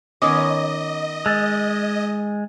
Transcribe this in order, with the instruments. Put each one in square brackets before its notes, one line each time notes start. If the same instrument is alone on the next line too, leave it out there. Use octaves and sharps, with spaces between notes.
[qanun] D#3 B3 C#4 [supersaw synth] D#5 [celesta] D6 D#6
[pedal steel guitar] G#3 [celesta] E6 A6